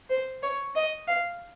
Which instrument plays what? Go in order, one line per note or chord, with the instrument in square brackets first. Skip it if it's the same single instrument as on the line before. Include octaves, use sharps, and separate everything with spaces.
[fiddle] C5
C#5
D#5
F5